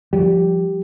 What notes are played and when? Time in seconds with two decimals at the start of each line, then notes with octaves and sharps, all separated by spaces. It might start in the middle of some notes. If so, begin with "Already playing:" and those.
0.13 F3 G3 G4